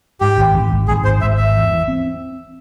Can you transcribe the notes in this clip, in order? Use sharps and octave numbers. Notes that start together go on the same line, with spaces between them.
G#2 G4
G#1
G#1
G#1
G#1 G#4
G#2 C5
G#1 E5
G#2 E5
E2
E3
C4